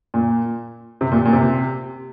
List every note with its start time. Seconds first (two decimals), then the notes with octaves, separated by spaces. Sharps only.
0.14 A#2
1.01 C3
1.12 A#2
1.25 A#2
1.33 C3